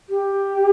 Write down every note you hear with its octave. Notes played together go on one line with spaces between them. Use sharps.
G4